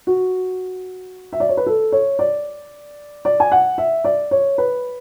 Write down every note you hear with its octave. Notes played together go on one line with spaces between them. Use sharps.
F#4
E5
D5
C#5
B4
A4
C#5
D5
D5
G#5
F#5
E5
D5
C#5
B4